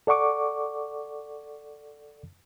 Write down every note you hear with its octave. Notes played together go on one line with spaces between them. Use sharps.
A4 D5 F#5 C#6 D6